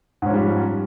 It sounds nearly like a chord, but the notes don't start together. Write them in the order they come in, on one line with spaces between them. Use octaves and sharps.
G#2 C#4 F3 G3